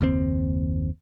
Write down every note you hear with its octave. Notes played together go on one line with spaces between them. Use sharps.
F#1 D#2 A#2 C4